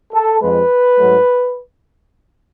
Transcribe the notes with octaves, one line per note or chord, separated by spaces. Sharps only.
A4
F2 F3 G#3 B4
G#2 F#3 A3